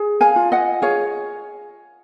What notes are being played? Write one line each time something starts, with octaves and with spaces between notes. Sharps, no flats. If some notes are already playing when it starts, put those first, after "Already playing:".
Already playing: G#4
F5 G#5
F4
D#5 F#5
G#4 C#5 F5